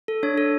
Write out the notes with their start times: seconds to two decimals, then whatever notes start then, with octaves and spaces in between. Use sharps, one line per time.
0.08 A4
0.23 D4 C#5
0.38 A4